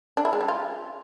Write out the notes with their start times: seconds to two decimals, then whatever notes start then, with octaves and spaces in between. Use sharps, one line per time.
0.17 D4
0.25 E4
0.33 G#3
0.41 G3
0.48 F4